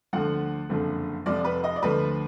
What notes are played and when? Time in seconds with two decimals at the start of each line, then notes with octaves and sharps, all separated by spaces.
0.13 D2 D3 F3 F#5
0.69 F#1 F2 D3 F3
1.26 F1 F2 F3 D5
1.44 B4
1.64 D#5
1.76 D5
1.82 D2 D3 F3 B4